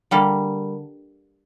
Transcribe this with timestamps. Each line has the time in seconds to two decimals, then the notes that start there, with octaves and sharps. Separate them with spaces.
0.11 D3 G3 A#3